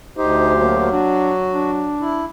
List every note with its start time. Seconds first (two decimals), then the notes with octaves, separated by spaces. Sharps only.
0.17 D2 D#4 G4 C5
0.57 F#3 A#3
0.92 D4 F#4
1.52 D4
2.00 E4